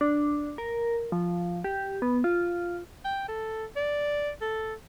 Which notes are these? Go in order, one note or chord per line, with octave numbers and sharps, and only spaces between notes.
D4
A#4
F3
G4
B3
F4
G5
A4
D5
A4